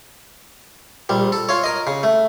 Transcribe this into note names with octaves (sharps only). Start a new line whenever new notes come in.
A#1 G3
A4
F4 C#5
A#4 D#5
C#3
A3